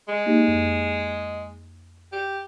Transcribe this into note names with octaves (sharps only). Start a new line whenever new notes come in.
G#3
A#3 D#4 G4
F2
G4